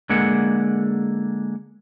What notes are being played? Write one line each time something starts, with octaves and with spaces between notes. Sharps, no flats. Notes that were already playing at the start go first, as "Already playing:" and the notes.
D3 G#3 A#3 G#4 F#5